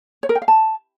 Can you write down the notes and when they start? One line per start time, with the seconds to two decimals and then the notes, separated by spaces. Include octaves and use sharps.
0.23 C#5
0.29 A#4
0.35 G5
0.42 F5
0.48 A5